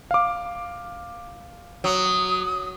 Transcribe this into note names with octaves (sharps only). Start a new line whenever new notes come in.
F5 D6
F#3 D#6